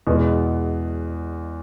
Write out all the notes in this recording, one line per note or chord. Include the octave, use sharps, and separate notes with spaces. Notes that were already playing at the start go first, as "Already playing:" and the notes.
E2 B2 G#3 B3